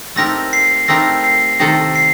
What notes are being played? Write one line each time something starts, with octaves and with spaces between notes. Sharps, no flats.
A3 C4 D#4 G4 A#4 A#6
C7
A3 C4 D#4 G4 A#4 A#6
C7
C3 D#3 A3 D#4 A4 A#6
C7